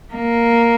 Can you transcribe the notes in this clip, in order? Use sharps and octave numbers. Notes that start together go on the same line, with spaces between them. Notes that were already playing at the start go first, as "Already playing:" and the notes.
A#3